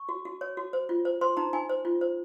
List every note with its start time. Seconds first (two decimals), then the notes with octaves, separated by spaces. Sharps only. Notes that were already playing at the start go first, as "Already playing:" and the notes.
Already playing: C#6
0.09 F#4
0.25 F#4
0.41 C#5
0.57 F#4
0.73 C5
0.89 F4
1.05 C5
1.21 C5 C6
1.37 D#4 A#5
1.53 D#4 G#5
1.70 C5
1.85 F4
2.01 C5